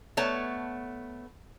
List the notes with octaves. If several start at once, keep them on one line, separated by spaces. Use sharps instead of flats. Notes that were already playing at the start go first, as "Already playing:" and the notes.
A3 B3 C#5 A5